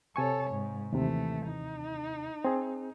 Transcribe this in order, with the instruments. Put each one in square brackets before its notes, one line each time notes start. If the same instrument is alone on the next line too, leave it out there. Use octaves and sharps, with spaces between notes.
[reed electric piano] C3 G#5 C#6 [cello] A4 C#5
[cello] G#2
[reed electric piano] D#2 C3 [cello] E3 A3
[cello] D#4
[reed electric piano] C4 G#4